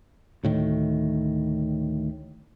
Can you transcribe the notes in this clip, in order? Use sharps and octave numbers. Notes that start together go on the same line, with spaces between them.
D2 A2 D#3